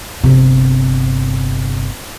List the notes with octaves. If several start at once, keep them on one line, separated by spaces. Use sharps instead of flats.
G1 C3